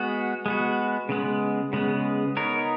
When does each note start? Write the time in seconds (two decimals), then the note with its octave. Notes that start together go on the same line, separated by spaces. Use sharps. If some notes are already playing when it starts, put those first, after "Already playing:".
Already playing: G#3 B3 F#4
0.46 G#3 B3 F#4
1.09 C#3 G#3 B3
1.73 C#3 G#3 B3
2.36 B3 D#4 A#4 C#5